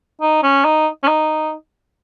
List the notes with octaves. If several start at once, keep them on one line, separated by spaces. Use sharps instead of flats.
D#4
C#4
D#4
C#4
D#4